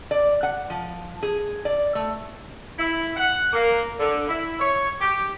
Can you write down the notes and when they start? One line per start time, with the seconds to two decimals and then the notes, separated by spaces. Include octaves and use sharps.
0.11 D5
0.43 F#5
0.70 F3
1.23 G#4
1.65 D5
1.95 A3
2.78 E4
3.16 F#5
3.53 A#3
3.99 D3
4.28 E4
4.60 C#5
5.00 G4